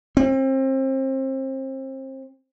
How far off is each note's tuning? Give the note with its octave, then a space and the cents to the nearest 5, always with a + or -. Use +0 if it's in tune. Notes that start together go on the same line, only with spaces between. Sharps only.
C4 +30